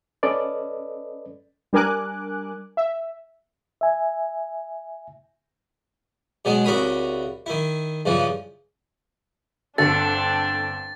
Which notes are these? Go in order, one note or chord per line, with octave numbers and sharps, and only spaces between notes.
C#4 A4 B4 D5 D#5
G3 D4 A#4 G#5 D6 F#6
E5
E5 G#5
B2 F#3 G#3 G#4
C2 C#3 F#4 A#4 B5 D#6
D#3 E4
G2 C#3 E3 F3
G1 D3 C4 D4 A4 A6